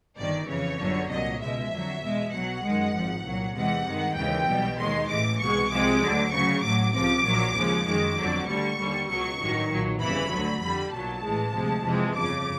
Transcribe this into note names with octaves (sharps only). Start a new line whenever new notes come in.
G1 G2 D#3 D5
F2 C#3 E3 C#5
G1 F#2 D3 F#3
C2 A#2 F#3 D#5
C#2 B2 G#3 E5
F2 D3 F#3
E2 B2 G#3
B1 B2 F#3 F#5
F#2 D#3 G#3
G#1 G#2 F3
C2 A#2 F#3
E2 C3 E3 G#3 F#5
G2 D#3 G#3
D#2 C#3 E3 G#3 G5
B1 B2 G3
D#2 D#3 G#3 C6
A1 A2 E3 D6
C2 B2 G#3 C#6
C2 C3 F3 G#3 D6
D2 D3 F#3
D2 C#3 F#3 C#6
A1 A2 F#3 D6
C#2 C3 F3 D6
A#1 A#2 F#3
D#2 C#3 F3 G#3
F#2 D#3 G#3 D6
G1 F2 D3 F#3
D2 D3 G3 C#6
D#2 D3 G3
C#2 B2 F#3 C#6
A1 G2 D#3 F#3
B1 A#2 F#3
G1 F2 C#3 E3 B5
D2 D3 F#3
F2 D3 G3 B5
B1 A#2 F#3 A5
A1 A2 E3 G#3
D2 C3 F3 G#3
F2 C3 E3 G#3
G1 F2 C#3 D6